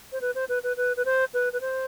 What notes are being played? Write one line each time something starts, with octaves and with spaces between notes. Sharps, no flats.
C5
B4
C5
B4
B4
B4
B4
C5
B4
B4
C5